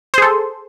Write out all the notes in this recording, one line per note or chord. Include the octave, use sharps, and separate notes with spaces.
G#4 A4 C5